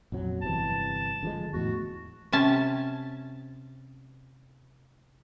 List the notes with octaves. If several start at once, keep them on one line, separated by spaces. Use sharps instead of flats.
A#1 F2 F#3
G1 C3 E3 A5
D3 F3 G#3
E2 A2 F#4
C3 C#4 A5